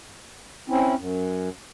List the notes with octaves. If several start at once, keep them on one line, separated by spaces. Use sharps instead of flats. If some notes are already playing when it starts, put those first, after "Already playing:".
C4 C#4 E4
F#2